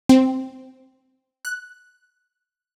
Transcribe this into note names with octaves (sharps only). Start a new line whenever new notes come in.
C4
F#6